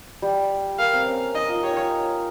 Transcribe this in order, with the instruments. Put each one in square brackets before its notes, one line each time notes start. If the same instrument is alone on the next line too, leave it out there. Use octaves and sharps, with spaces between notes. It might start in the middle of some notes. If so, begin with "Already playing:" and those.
[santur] G3
[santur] A#3 [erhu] F5
[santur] C4
C#4
[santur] D#4 [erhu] D#5
[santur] F4
[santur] G4 [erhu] C#5
[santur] D#4
F4